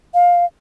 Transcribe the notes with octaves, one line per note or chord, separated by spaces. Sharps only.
F5